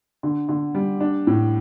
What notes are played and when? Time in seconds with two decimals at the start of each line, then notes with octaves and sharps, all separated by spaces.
0.23 D3
0.49 D3
0.75 G3
1.00 D4
1.27 A2